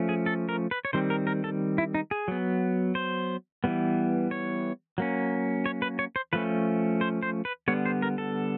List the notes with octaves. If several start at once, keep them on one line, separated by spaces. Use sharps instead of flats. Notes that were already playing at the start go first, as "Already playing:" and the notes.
Already playing: F3 A3 C#4
G#4
A4
A#4
B4
C#5
D#3 G3 C4 C5
A#4
A#4
A4
E4
D#4
G#4
F#3 B3
C5
E3 G3 B3
C#5
F#3 A#3 C#4
C#5
B4
C#5
C5
F3 A3 C#4 B4
C5
C5
B4
D3 G3 B3 C#5
C5
A#4
A4